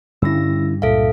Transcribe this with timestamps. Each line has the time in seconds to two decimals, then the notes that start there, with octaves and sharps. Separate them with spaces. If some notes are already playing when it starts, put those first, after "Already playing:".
0.22 G2 D3 G3 C#4 E4 E6 A#6
0.82 C#2 A#2 A4 E5 F5